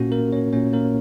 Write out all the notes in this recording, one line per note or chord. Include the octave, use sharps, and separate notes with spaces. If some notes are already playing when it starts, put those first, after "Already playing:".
Already playing: A#2 A#3 C#4 F#4
A#3 A#4
C#4 C#5
A#2 A#3 C#4 C#5
A#3 A#4